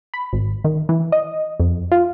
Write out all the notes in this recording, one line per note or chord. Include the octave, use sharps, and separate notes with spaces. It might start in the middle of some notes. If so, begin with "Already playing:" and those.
B5
G#1
D#3
E3
D#5
F2
F4